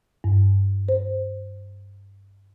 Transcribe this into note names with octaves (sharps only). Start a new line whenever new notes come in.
G2
C5